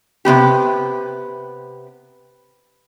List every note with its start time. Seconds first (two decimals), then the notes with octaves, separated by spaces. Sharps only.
0.25 C3 E3 B3 G4